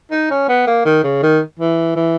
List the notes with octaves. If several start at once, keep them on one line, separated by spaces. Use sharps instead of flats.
D#4
C#4
B3
A#3
D#3
C#3
D#3
E3
E3